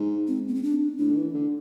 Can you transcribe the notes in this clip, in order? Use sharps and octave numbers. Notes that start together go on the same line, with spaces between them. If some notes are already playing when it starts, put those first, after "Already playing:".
Already playing: G#2
C4
B3
C4
D4
A2 D4
D3
E3
D3